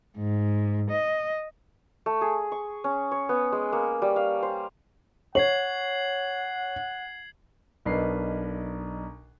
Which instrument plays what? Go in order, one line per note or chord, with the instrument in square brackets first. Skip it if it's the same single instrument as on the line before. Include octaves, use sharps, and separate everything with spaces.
[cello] G#2
D#5
[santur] A3
G#4
C#6
C#4
C#5
B3
G#3
A#3
G3
F5
C5
[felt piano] C#5 [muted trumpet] F#5 [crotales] G#6 C7 F#7
[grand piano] B1 D4 A#4 B4 D#5 C7